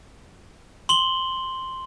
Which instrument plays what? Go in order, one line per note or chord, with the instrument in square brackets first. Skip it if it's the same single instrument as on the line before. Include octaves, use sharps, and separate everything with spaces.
[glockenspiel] C6 F#7 G7